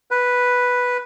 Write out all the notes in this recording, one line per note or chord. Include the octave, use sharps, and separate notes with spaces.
B4